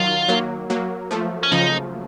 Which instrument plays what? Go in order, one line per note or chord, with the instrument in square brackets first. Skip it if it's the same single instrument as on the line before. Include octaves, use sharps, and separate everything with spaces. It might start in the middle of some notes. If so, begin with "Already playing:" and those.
Already playing: [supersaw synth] D#3 F#3 [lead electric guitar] F4
[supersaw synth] F#3 A#3
F#3 A#3
F3 A3
[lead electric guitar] C#4
[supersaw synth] C#3 F3 [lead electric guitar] D#4